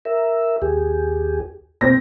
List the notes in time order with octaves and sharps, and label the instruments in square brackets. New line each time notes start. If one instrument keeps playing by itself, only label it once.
[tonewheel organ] A#4 E5
D#2 G4 G#4
[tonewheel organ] B2 [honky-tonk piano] C4 A#6